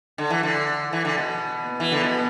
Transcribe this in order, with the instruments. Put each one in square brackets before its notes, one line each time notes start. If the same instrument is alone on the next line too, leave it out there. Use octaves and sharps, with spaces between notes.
[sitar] D3
E3
D3
E3
D3
B2
[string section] B3
[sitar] E3
D3
B2